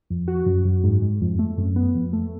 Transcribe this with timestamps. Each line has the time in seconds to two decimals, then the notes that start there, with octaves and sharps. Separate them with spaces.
0.10 F2
0.28 F#4
0.46 F#2
0.65 F#2
0.84 G#2
1.02 G#2
1.21 F2
1.39 A3
1.58 F#2
1.76 B3
1.95 F2
2.13 A3